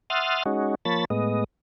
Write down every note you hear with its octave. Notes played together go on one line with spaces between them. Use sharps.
E5 F#5 C6 D#6 F6 A6
G#3 C#4 D#4 F#4
F3 A#3 C#5 A5 B5 A6
A2 G#3 B3 D#5